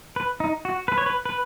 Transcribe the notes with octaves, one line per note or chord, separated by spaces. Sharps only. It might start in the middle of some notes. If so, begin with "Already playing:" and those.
B4
D#4
F#4
B4
C#5
B4
B4